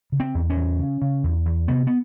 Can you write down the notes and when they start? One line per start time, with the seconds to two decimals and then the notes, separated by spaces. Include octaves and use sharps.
0.12 C#3
0.20 C4
0.35 E2
0.50 C#4
0.57 E2
0.79 C#3
1.02 C#3
1.24 E2
1.46 E2
1.68 C3 B3
1.87 B3